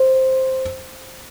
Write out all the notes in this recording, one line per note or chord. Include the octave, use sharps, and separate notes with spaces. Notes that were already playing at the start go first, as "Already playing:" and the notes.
Already playing: C5